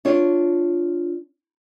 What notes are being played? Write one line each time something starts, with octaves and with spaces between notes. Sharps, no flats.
D4 F4 C#5